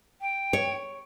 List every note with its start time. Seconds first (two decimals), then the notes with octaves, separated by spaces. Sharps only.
0.21 G5
0.53 C#5